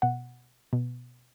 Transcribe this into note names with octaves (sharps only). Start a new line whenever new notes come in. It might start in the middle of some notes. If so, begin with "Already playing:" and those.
B2 F#5
B2